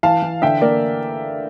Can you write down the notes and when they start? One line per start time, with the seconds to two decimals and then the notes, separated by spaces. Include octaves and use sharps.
0.03 E3 F5 A5
0.22 E3
0.42 D3 E5 G5
0.61 A#3 A#4 D5